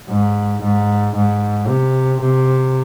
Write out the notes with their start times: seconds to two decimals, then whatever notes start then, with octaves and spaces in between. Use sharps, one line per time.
0.09 G#2
0.62 G#2
1.15 G#2
1.68 C3
2.21 C3